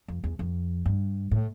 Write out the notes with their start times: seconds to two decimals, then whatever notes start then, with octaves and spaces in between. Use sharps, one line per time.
0.08 F2
0.24 E2
0.39 F2
0.86 G2
1.31 A2